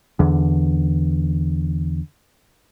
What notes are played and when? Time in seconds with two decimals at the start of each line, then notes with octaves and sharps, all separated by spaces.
0.19 E2 D3